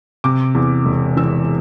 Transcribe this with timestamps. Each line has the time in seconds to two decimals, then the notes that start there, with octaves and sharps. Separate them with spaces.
0.24 C3 D6
0.55 E2
0.86 E1
1.17 E3 E6